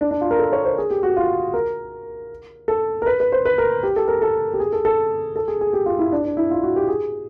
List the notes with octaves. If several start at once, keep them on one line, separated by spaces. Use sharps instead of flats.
D4
D4
F4
A#4
A4
C#5
C5
G#4
G4
F#4
F4
A#4
A4
A#4
B4
B4
C5
B4
A#4
G4
A4
A#4
A4
G4
G#4
A4
A4
A4
G#4
G#4
G4
F4
E4
D4
D4
E4
F4
F#4
G4
G#4